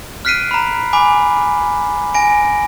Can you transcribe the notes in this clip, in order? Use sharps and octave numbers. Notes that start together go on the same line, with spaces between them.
F6 F#6 B6 C7 D7 D#7
A#5 B5
G#5 B5 D6
G#5 A#6 D7